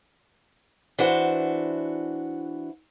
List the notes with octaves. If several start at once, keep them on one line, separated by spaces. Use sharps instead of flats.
E3 D4 F#4 C5